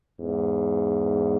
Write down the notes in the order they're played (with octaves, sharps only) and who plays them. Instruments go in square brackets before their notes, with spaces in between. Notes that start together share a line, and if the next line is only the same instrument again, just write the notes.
[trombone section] E2 G#2